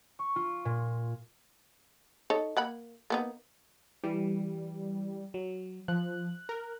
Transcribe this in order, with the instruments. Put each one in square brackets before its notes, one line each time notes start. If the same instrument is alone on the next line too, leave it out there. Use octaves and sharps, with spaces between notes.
[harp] C#6
F4
A#2
[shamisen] D#4 A4 C#5
A#3 F#5 B5
A#3 B3 D#4
[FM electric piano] E3 [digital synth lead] G3
[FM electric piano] F#3
[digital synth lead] F3 [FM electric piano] F#6
[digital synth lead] A#4